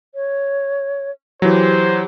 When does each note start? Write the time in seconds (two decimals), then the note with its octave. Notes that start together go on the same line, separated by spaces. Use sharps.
0.15 C#5
1.42 E3 F#3 G4 C5